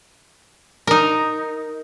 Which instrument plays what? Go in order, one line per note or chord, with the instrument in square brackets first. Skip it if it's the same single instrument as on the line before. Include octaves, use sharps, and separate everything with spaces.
[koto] D#4 A#4